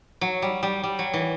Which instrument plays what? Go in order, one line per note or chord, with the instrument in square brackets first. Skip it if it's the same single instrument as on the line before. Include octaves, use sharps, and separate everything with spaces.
[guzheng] F#3
G3
G3
G3
F#3
E3